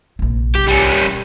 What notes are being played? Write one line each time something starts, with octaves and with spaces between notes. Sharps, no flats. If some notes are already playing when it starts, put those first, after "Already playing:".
A#1 C3
C2 G2 G4
G3 C#4
E1